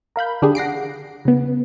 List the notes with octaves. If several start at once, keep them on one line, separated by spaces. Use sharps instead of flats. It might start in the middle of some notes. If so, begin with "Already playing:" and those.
A#4 F5 B5 G6
D3 D4 G4 G#4
F#5 A#6 C7 D7
C#3 B3